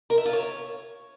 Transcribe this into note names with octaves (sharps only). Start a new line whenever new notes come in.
A#4
E5
F4
C#5